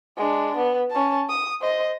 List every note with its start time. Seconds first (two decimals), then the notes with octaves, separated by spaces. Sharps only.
0.17 G#3 D4
0.57 B3
0.90 C#4 A5
1.29 D#6
1.61 C5 D#5